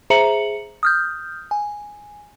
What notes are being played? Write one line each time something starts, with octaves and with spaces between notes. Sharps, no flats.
G#4 C5 E5 A#5 C#7 F#7
D#6 F6 G6
G#5